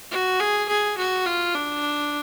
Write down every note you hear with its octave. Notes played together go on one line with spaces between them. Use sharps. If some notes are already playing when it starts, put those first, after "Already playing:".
F#4
G#4
G#4
F#4
F4
D4